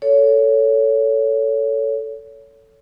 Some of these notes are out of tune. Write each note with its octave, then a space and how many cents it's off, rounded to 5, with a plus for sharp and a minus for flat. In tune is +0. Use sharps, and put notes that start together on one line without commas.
A4 +5 C#5 +20